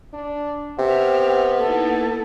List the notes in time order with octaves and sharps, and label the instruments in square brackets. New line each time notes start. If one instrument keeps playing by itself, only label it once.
[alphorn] D4
[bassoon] C3 [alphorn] B3 [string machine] E5 F6 [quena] G5
[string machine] A#3 D#4 E4 [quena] A4